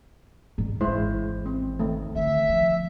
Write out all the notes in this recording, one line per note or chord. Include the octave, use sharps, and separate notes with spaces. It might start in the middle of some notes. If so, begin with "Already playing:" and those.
G#2 G3
G#1 E2 G#3 E4 C5
C4
D#3 A3
D3 E5
F3 B3